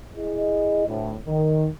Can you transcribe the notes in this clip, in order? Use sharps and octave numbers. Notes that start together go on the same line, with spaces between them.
E4 G#4 D#5
D2 A2
D#3